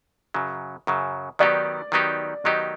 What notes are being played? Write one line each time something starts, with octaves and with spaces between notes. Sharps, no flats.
F#2 C#3 F#3
F#2 C#3 F#3
D#3 F#3 B3 D#4 G4 D5
D#3 F#3 B3 D#4 G4
D#3 F#3 B3 D#4 G4 D#5